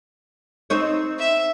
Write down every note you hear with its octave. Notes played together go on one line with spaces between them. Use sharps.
C4 D#4 C#5
E5